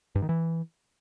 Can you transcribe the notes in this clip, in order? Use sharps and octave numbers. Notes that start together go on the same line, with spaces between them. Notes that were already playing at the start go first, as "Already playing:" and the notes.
G2
D#3
E3